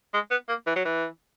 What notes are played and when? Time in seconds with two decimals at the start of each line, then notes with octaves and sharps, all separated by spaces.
0.14 G#3
0.31 B3
0.49 A#3
0.66 E3
0.76 F#3
0.85 E3